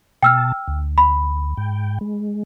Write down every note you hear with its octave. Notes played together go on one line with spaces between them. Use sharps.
B2 G5 A5 E6 F6
D2
B5
G#2 G5
G#3